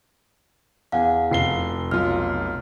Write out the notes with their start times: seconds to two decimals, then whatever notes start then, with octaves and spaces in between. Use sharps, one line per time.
0.92 E2 F5 F#5 G#5
1.31 F1 C7 G7
1.91 B1 F4 F6